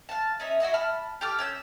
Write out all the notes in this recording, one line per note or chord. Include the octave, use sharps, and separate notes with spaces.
F5 A5
C#4 D#4 E5
E4 F#4 D#5 E5
A5 B5 F6
G4 A4 D6 F6
C#4 E6 G6